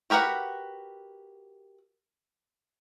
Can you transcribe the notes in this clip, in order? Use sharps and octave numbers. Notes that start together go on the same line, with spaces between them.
F#4 G4 A#4 B4 F#5